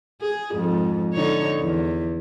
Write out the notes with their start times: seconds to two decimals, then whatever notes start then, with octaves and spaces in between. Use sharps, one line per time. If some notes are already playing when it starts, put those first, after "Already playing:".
0.21 G#4
0.52 F2 G#2 G#3
1.14 D3 D#4 C#5
1.60 E2